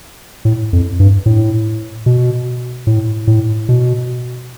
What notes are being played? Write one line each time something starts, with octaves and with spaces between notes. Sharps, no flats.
A2
F2
G2
A2
B2
A2
A2
B2